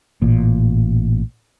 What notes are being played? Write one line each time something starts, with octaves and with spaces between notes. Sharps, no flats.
A1 A#2